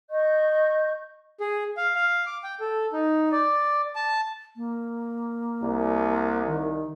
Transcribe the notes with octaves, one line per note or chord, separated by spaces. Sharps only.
D#5 C#6 G6
G#4
F5
F5
D6
G5
A4
D#4
D5
A5
A#3
C2
D#3